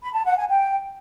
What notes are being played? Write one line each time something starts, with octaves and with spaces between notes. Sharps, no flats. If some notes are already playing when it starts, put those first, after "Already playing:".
B5
A5
F#5
G#5
G5